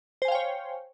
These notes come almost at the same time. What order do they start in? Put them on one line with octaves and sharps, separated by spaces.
C5 G#5 F5 G5 C#5